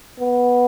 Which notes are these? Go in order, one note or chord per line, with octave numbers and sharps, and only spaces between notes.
B3